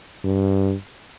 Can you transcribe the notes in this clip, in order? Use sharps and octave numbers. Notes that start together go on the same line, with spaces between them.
G2